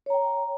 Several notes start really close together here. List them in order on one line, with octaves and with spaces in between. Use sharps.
C#5 A#5 G5